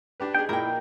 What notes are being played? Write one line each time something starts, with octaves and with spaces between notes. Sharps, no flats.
D4 G4 B4
D#4 G#4 G5
A#1 A#2 A#3 E4 A#4 G5